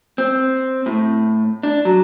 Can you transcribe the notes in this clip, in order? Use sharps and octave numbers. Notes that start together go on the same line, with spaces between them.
C4
A2
D4
F#3